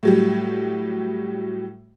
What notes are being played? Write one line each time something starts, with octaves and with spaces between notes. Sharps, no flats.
A2 F#3 G3